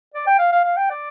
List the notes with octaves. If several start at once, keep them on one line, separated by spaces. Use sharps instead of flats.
D5
G5
F5
F5
F5
G5
D5